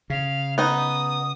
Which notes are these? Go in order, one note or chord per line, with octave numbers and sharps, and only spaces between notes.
C#3 F5
B3 D#4 D#6